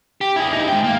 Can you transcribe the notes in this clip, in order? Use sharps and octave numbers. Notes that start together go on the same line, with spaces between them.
G4
E4 G#4
D#4 E4
G#3 G5
A#3